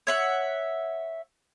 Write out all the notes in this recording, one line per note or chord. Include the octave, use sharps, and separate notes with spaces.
C#5 E5 F#5